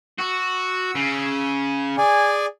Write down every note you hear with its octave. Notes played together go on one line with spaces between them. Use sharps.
F#4 E6
C#3
G#4 D5 G#5